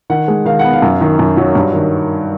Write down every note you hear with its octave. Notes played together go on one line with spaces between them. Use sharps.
D#3 F#5
G#3
D#3 F5
F#5
B3
F5
F#2
D#3
F#2
F#3
G2
D#3